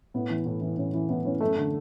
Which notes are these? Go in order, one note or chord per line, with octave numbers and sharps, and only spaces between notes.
A2 B3
E3
A2
E3
A2 C#4
E3
A2 B3
E3 C#4
F#2 A3
D3